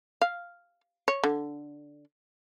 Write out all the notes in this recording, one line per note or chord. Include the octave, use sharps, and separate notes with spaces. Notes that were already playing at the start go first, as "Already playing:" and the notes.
F5
C#5
D3